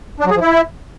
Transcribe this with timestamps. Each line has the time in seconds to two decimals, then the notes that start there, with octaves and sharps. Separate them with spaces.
0.20 D4
0.25 F#3
0.31 G#4
0.36 F3
0.41 E4